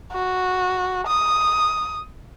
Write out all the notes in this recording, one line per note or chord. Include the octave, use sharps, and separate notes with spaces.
F#4
D#6